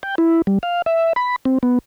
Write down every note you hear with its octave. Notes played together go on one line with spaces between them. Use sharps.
G5
E4
G3
F5
E5
B5
C4
B3